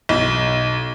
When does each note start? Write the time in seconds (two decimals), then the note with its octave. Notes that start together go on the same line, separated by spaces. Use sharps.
0.09 B1